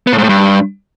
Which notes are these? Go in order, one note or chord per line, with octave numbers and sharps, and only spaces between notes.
B3
A2
G#2
A2
G2